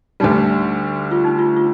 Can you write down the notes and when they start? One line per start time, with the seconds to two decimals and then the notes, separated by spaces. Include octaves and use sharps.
0.20 D2 D3 G3 D#4
1.11 F4
1.25 D#4
1.39 F4
1.56 F4